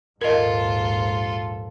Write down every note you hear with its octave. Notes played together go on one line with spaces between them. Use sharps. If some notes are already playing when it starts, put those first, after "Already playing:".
A#1 D#2 G#2 F4 A4 A#4 D#5